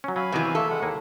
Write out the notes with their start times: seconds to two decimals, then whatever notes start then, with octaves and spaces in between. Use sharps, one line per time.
0.04 F#3 C#4
0.16 F#3 F5 G#5 B5
0.32 E2 C3 E3 F#4 D#5
0.55 A3 A#3 A4 E5
0.70 G#3 F#5
0.82 D#2 A#3 G#5